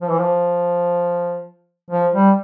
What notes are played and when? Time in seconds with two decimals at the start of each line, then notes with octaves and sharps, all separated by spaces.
0.02 F3
0.10 E3
0.20 F3
1.90 F3
2.14 G3